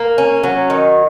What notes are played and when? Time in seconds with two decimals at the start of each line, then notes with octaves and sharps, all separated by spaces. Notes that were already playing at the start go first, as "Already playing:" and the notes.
Already playing: A#3
0.18 C#4
0.43 F#3
0.70 D#3